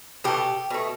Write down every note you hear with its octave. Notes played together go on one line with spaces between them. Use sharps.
B2 A3 G4
B2 A3